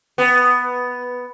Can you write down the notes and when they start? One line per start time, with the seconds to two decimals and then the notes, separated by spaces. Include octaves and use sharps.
0.18 B3